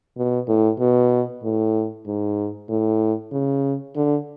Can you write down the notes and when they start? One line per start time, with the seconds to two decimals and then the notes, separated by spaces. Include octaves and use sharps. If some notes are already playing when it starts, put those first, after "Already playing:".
0.17 B2
0.48 A2
0.79 B2
1.43 A2
2.06 G#2
2.69 A2
3.32 C#3
3.96 D3